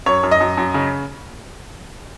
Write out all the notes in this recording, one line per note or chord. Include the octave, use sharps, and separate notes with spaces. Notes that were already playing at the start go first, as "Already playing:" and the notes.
F#2 C#5
F#2
D#5
F#2
F#2
C#3